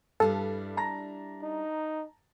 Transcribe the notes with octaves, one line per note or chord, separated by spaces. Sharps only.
G2 G3 D4 E4 A4
A5 A#5 A#6
D#4